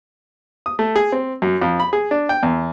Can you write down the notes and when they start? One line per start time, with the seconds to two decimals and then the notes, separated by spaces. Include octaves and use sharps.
0.66 D#6
0.79 A3
0.96 G#4
1.12 C4
1.42 F#2
1.62 F2
1.80 B5
1.93 G#4
2.11 D4
2.29 G5
2.43 E2